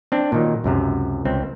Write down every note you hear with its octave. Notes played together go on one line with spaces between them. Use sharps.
C4 D4
A#2 D#3 F#3
C#2 F#2 C3
C#2 C4